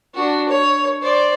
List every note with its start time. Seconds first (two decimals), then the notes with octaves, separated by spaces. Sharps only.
0.14 D4 F#4
0.49 C#5
1.02 C5 D5